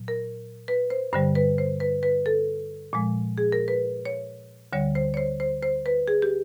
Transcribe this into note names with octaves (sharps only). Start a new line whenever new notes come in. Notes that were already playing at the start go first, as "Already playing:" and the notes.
Already playing: A#2 F#3
A#4
B4
C5
G2 D3 G3 C5
B4
C5
B4
B4
A4
A#2 F3 G#3
G#4
A#4
B4
C#5
D2 D3 G3 C#5
C5
C#5
C5
C5
C5
B4
G#4
G4